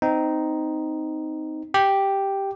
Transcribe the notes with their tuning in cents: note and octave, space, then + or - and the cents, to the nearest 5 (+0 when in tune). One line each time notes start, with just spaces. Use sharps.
C4 -20 D#4 +0
G4 +0 G5 +0